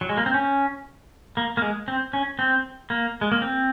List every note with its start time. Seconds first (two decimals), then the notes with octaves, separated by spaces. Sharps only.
0.01 F#3
0.09 G#3
0.17 A#3
0.26 C4
0.34 C#4
1.37 A#3
1.57 A#3
1.62 G#3
1.88 C4
2.13 C#4
2.39 C4
2.90 A#3
3.21 G#3
3.32 A#3
3.42 C4